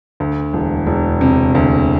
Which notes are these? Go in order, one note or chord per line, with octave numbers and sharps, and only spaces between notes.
D2
E1
E1
C3
D2